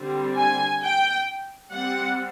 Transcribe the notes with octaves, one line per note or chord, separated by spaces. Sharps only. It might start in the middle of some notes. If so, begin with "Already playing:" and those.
Already playing: D3 G3 C4
G#5
G5
G3 C4 F#5